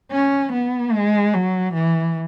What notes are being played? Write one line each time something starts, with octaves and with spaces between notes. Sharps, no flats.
C#4
B3
G#3
F#3
E3